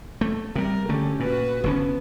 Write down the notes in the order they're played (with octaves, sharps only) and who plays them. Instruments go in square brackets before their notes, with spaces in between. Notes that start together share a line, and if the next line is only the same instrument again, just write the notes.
[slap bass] A3
[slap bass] C3 G3 [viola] A#4
[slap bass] D3 A3 [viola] C#4 G4
[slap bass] A#2 [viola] F#4 B4
[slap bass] F1 D3 C#4 [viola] B3